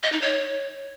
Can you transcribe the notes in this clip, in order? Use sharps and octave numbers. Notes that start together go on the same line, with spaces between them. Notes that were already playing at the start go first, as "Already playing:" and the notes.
D#5
D#4
C#5